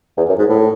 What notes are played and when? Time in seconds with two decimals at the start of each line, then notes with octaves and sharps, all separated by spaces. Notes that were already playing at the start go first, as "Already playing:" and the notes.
0.18 E2
0.28 F#2
0.39 G#2
0.49 A2